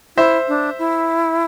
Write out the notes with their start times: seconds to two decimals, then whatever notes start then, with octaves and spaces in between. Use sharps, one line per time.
0.16 E4 C5 E5
0.48 D4
0.79 E4